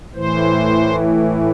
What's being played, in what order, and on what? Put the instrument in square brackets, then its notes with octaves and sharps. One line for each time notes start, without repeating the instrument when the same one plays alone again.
[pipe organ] A2 E3 C5